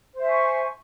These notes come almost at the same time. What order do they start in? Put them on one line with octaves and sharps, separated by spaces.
C5 E5 G#5 C#6